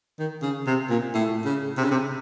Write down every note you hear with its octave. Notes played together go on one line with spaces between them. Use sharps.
D#3
C#3
C3
A#2
A2
C#3
C3
C#3
C3